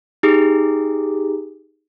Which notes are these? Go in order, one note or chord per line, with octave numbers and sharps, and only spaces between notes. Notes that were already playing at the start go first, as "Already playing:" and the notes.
D#4 G4 G#4